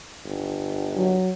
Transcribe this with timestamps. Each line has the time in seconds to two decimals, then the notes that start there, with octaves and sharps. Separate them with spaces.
0.25 G1
0.97 F#3